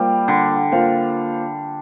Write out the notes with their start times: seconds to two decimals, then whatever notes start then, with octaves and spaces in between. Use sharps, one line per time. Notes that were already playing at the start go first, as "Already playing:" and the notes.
Already playing: G3 A#3 F4 C5 F5
0.28 D3
0.72 A#3 F4 C5 F5